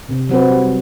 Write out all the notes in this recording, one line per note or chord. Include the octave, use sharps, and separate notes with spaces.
C3
F#3 C4 F#4 B4
G3